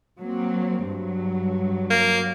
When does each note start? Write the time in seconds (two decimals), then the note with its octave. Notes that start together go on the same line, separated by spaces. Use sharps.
0.20 F#3 A#3 C4
0.86 G2 F#3
1.90 A#3